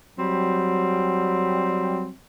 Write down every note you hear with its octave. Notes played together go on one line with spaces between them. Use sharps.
F#3 G3 C4